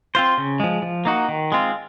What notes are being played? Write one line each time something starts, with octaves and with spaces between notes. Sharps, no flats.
C4 F4 C5
C#3
F3 G#3
F3
A#3 D#4 F#4
D#3
G#3 C4 F4